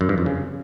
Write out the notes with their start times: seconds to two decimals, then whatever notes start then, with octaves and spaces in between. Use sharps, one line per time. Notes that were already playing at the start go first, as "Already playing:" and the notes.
0.01 F#2
0.09 G2
0.18 F2
0.26 C#3